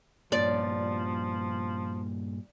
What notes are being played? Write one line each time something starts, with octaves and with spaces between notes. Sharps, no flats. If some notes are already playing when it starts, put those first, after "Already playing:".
G2 A#2 F3 D5